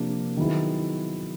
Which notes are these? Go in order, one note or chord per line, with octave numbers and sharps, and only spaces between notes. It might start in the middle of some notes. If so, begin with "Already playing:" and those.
Already playing: C3 F3 A#3 D4 G4
D#3 F#3 B3 E4 G#4